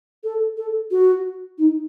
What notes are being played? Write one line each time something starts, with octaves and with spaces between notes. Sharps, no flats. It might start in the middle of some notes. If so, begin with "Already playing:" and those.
A4
A4
F#4
D#4